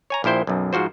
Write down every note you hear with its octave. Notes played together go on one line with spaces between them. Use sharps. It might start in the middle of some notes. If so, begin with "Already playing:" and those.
C#5 G#5 A#5
A#1 F3 E4 C5 G5
B1 F#2
G#2 F3 F#4 C5